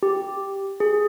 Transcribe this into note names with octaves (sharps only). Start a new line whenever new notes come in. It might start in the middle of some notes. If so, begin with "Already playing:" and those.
G4
G#4